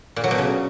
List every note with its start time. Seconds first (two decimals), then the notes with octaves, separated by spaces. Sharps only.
0.16 A#2
0.24 F#3
0.31 B2
0.38 C#3